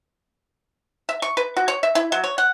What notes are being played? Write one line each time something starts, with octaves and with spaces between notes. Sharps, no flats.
E5
C#6
B4
F#4
C#5
E5
E4
F#3
C#5
F#5